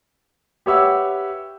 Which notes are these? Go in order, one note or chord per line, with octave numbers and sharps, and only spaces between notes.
G4 B4 C#5 E5 F#5 E6